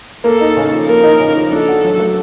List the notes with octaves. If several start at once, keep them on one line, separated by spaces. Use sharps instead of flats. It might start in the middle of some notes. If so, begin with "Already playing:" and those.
A#3 A4
D#4
C#3
F3
A#3 A#4
D#4
C#3
F3
D4 A4
F#4
F#3
A3